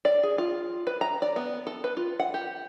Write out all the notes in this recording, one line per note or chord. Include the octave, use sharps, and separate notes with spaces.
D5
G#4
F4
B4
A#5
D5
B3
A4
B4
F4
F#5
G4